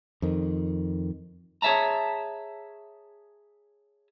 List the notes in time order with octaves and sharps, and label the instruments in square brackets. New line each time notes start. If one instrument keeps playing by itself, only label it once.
[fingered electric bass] F2 D#3
[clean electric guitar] G#4 C#5 E5 A5 A#5